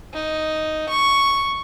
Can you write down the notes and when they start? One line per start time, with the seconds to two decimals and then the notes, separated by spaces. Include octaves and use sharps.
0.13 D#4
0.89 C#6